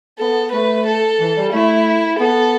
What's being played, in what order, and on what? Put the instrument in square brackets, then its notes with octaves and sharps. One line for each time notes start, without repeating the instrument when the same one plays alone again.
[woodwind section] B3 [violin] A4
[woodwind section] A3 [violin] B4
[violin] A4
[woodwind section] E3
G3
[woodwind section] A3 [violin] E4
[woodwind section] B3 [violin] A4